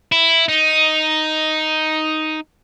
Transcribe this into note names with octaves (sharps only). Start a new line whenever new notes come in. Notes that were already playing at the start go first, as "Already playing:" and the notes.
E4
D#4